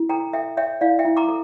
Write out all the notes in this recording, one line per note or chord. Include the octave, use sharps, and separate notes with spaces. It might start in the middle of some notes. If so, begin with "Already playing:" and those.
Already playing: E4
A4 G5 A#5
A4 E5 G5
C#5 E5 G5
E4 D5 F5
E5 G5
E4
A#5 D6
A4